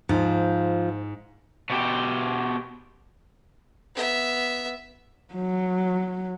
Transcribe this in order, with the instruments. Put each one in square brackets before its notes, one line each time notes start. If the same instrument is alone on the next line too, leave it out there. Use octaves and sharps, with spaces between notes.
[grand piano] G#2 [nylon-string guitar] F3
[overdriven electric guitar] B2 G4
[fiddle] B3 E5
[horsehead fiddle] F#3